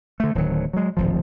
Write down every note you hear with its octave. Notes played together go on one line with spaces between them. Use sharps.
D3 A3
D1 D#3 F#3
F#3 G#3
D1 G#1 F3